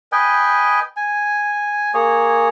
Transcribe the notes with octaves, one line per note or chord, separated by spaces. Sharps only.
B4 D#5 G5 G#5
G#5
A#3 G#4 C#5